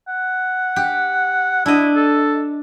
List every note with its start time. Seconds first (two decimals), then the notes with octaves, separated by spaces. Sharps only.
0.08 F#5
0.76 G4
1.66 D4 E4 D#5
1.96 A4